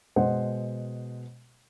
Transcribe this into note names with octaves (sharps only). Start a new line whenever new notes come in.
B2 G#3 C5 D#5 F#5